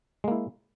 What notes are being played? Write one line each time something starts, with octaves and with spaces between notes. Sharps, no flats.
G#3 A#3 E4